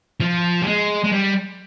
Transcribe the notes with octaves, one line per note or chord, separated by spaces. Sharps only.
F3
G3
G#3
G#3
G3